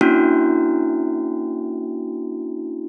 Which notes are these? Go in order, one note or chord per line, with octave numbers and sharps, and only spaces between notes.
A#3 C#4 D4 E4 F#4